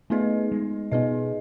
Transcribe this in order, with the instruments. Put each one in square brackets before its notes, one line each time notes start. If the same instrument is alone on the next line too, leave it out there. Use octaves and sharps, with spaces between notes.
[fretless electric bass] A3 [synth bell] B3 D#4 G#4 B4 D#5
[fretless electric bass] G#3
[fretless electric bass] B2 [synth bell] B3 D#4 G#4 B4 D#5